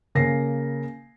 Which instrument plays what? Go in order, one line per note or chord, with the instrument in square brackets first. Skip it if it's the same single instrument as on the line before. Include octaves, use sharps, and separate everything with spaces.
[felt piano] C#3 A#3 A#6 C7